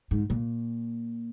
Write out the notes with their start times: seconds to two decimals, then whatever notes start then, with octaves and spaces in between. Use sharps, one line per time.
0.11 G#2
0.30 A#2